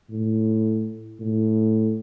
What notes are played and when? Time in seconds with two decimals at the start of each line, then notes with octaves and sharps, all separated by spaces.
0.10 A2
1.20 A2